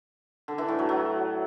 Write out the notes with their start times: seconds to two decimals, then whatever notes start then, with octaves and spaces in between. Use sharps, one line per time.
0.48 D3
0.58 E3
0.68 A2
0.79 F#3
0.89 F#3